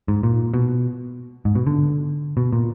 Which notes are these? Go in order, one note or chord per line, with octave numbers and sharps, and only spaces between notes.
G#2
A#2
B2
G#2
B2
D3
B2
A#2